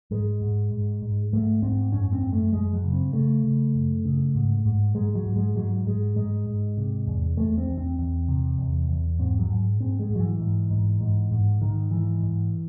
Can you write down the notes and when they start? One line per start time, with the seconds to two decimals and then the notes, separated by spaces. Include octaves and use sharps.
0.11 G#2 G#3
0.42 G#2
0.72 G#2
1.02 G#2
1.33 G#2 A3
1.62 G#2 C4
1.93 F#2 C#4
2.13 C4
2.22 F#2
2.33 A3
2.53 F#2 G#3
2.73 F#3
2.84 C#3
2.93 C4
3.13 C#3 A3
3.44 C#3
3.75 F#2
4.05 C#3
4.35 G#2
4.65 G#2
4.95 G#2 G#3
5.15 F#3
5.26 G#2
5.36 G#3
5.56 G#2 F#3
5.86 G#2 G#3
6.16 G#2 G#3
6.46 G#2
6.77 C3
7.07 E2
7.37 E2 A3
7.58 C4
7.68 E2
7.78 C4
7.98 E2
8.28 C3
8.58 E2
8.89 E2
9.19 G#2 C4
9.39 F#3
9.50 G#2
9.80 G#2 C4
9.99 G#3
10.10 G#2
10.16 F#3
10.20 E3
10.40 G#2
10.71 G#2
11.01 G#2
11.31 G#2
11.61 G#2 D#3
11.91 G#2 E3
12.23 G#2